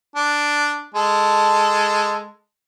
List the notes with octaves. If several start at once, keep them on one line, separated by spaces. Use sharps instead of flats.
D4
G#3 A4